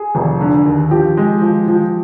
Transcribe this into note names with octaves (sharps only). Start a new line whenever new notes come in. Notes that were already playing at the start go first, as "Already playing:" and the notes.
Already playing: G#4
F1
D3
D#2
F3 G4
G#3
F3
F3